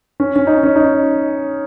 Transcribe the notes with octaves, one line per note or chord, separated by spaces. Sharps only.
C#4
C#4
D#4
C#4
D#4